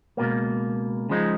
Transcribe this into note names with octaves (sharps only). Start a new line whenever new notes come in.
C#2 B2 A#3
C#3 F3 G#3 D#4